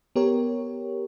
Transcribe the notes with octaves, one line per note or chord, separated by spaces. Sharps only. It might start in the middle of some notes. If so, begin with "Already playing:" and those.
B3 G4 A#4 C#5